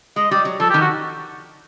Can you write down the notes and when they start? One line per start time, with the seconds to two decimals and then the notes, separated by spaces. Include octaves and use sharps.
0.16 G#3 D#5
0.31 G3 D5
0.45 F#3
0.60 F3 A4
0.70 G4
0.74 D#3
0.81 F#4